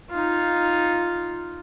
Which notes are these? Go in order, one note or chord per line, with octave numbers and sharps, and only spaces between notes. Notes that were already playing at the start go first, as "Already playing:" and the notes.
D#4 F4